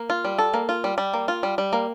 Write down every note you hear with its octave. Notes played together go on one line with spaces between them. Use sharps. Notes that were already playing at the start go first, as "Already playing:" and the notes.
Already playing: A#3
F4
G3
A4
A#3
F4
G3
G3
A#3
F4
G3
G3
A#3